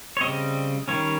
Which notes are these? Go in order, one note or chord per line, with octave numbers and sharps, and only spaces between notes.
C#5
C#3 G3 C4 D#5
D#3 G3 C#4 C#5